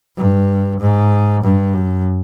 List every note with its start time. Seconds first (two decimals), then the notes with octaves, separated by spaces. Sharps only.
0.17 G2
0.80 G#2
1.43 G2
1.74 F#2